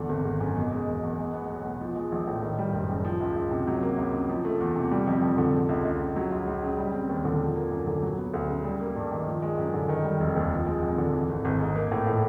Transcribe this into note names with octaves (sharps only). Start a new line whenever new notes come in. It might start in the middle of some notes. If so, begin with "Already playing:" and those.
Already playing: E2 D3
G#1
G#1
F#2
B2
G#3
E1
E2
G#3
B3
B1
B2
F3
G#3
A#1
A2
D#3
G3
F#1
F#2
F3
C#2
C#2
C3
F#3
A#3
C#2
C#3
F3
A3
E2
C3
G3
F2
F2
D3
F3
C#2
C#2
C#3
F#3
C#2
C#2
C#3
G3
C4
D#2
D3
F3
A#3
F#2
D3
F#3
B3
D2
C#3
G3
A#3
G2
D#3
F3
G#3
F#2
D3
D#3
G3
F1
D#2
F3
G#3
F2
D3
E3
G#1
G#1
G#2
A#3
A2
A2